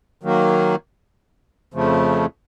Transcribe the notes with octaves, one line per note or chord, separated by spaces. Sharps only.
D#3 F#3 A#3
F2 C#3 F3 A3